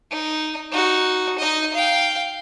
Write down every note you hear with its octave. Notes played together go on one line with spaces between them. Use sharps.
D#4
D#4 F#4
D#4 D#5
F5 G5